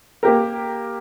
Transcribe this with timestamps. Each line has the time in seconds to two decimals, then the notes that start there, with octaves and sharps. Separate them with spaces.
0.23 A#3 G4 A#4